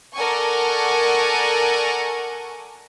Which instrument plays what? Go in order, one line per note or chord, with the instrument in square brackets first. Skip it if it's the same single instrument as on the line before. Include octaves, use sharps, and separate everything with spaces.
[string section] A4 A#4 D5 F#5 G#5 C#6